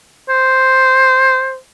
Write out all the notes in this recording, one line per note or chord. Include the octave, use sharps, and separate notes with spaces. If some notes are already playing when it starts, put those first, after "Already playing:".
C5